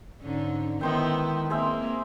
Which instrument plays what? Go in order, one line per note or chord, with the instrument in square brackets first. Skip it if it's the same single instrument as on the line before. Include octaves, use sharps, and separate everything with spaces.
[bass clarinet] G#2 [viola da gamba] D3 C#4
[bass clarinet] D#3 [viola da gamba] G#3 B3 E4 [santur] D#4 C5 G5
[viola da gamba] A#3 C4 [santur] G#4 C5 E5